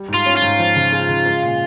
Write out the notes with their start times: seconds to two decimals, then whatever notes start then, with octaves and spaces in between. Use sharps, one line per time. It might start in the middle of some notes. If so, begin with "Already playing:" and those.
Already playing: G3
0.08 G#2
0.14 F4
0.26 C#4
0.37 F4
0.42 G#2
0.59 F3
0.76 C#3
0.93 G#3
1.09 C#3
1.26 G#3
1.43 A#2